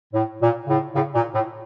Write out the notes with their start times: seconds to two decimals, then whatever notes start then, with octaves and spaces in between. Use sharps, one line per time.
0.13 A2
0.40 A#2
0.67 A2 C#3
0.94 A2 C#3
1.13 A#2
1.34 A2